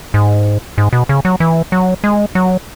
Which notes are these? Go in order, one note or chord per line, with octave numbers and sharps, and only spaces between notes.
G#2
G#2
B2
C#3
F#3
E3
F#3
G#3
F#3